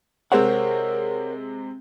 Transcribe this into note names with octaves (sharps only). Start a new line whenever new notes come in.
C3 G#3 C4 A#4 C5 C#5 F#5